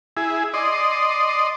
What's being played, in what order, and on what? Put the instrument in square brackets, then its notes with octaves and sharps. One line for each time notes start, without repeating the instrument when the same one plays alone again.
[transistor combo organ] E4 G#4
D5 D#5 C6